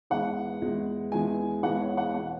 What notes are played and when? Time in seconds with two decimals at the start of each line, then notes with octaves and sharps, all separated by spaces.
0.10 E2 E3 G#3 F#5
0.62 E2 E3 G#3
1.12 E2 E3 G#3 G#5
1.63 E2 E3 G#3 F#5
1.81 C#5
1.97 F#5
2.14 B2 B3 F#5